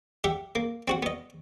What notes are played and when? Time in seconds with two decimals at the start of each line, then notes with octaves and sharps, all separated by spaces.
0.24 G4 E5 F#5
0.55 A#3
0.88 C4 F#4 F#5
1.03 B3 D#5